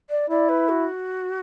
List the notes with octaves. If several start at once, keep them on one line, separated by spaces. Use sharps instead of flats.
D5
E4 D5
B4
F#4